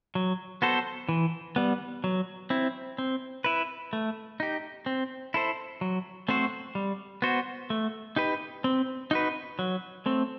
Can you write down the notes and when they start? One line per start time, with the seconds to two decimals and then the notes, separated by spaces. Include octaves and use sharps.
0.15 F#3
0.62 B3 F#4 A4 C5
1.09 E3
1.56 G3 B3
2.04 F#3
2.50 C4 E4
2.98 C4
3.44 E4 B4
3.93 A3
4.40 D#4 G4
4.86 C4
5.34 E4 A4 C5
5.81 F#3
6.28 A3 C4 F#4 C5
6.75 G3
7.22 B3 F#4 C5
7.70 A3
8.16 D#4 G4 B4
8.64 C4
9.11 D#4 F#4 B4
9.59 F#3
10.06 A3 C4